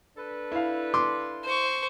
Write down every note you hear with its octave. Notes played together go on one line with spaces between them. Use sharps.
D4 A4 B4
E4 F5
C6 D6
C5 C#6